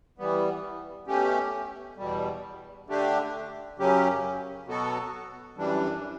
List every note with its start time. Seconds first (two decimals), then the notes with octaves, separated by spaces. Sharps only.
0.18 E3 G3 B3
1.07 B2 A3 C#4 G4
1.97 E2 B2 G3
2.87 D3 A3 D4 G4
3.78 F#2 C#3 F#3 C#4 G4
4.66 B2 F#3 B3 F#4 A4
5.56 F#2 E3 G3 D4